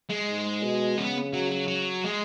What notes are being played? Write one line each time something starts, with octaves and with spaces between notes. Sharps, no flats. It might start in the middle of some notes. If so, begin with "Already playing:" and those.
G#3
G#2
B2
C#3 B3
F#3
F#3
F#3
G#3